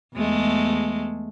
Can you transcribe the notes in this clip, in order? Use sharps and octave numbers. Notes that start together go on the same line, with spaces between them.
E2 G#3 A3